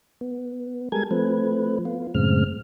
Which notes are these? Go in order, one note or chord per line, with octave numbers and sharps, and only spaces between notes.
B3
G3 G#3 A4 A#4 G#5 G#6
F3 A3 C4 B4
B3 F4
F#2 A2 C#3 G#3 C4 F6